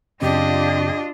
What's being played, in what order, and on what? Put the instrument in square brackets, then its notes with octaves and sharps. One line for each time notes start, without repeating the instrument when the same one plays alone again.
[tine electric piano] F#2 C#3 C4 [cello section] D4 F4 [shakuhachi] G4 [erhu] D#5